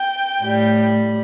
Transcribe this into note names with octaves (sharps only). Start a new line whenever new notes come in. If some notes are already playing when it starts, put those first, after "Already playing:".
Already playing: G5
A2 G3